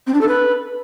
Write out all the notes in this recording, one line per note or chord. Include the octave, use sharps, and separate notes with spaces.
C4
D4
A4
B4